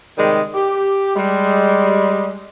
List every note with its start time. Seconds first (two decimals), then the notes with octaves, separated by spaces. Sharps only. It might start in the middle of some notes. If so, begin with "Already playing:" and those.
0.17 C3 D#3 G3 G#3
0.54 G4
1.16 G3 G#3